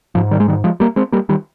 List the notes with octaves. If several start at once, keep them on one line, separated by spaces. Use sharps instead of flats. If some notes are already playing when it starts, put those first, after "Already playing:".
G#2 F3
D#3 G3
G#3
D#3 G3
F3 G#3
G3 A#3
G#3 C4
G3 A#3
D#3 G3